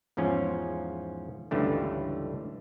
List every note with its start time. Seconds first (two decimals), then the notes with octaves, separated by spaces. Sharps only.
0.17 E2 G#2 F3 C#4
1.51 C#2 G2 D3 E3 A3